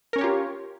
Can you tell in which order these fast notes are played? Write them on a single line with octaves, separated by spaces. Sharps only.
A#4 C#4 C#5 G4 F4